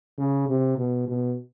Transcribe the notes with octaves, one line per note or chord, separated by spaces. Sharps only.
C#3
C3
B2
B2